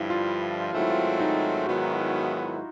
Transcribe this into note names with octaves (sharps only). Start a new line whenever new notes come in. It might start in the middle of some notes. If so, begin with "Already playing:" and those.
Already playing: G2 D3 F3 E4
F4
G#2 D#3 F#3 A3 C4 F4
E4
F4
D#4
G#2 D#3 F#3 B3 E4 F#4